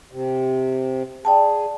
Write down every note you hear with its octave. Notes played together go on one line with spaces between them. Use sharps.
C3
G#4 D5 G5 A5